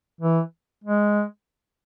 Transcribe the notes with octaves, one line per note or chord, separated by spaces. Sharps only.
E3
G#3